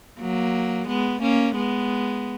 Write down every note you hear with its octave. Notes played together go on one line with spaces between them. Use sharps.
F#3 A#3
G#3 B3
A#3 C#4
G#3 B3